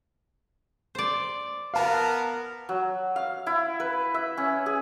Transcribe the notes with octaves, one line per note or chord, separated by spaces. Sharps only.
C5 D5
B3 A#4 F5 A5
F#3
F5
E4
B4
E5
C#4
G#4